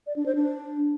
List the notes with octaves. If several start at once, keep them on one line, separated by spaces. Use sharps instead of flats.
D5
D4
C5
D4